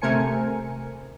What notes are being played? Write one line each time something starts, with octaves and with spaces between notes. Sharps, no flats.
C3 A3 A#4 C5 G#5 C#7